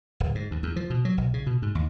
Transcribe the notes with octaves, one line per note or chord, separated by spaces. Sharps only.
D1
G#2
D#2
E2
F3
B2
F#3
B1
C#3
B2
G#2
D#2